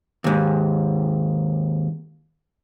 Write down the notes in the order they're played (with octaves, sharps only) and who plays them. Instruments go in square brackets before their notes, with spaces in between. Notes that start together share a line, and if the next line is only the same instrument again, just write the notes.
[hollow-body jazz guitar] D#2 G#2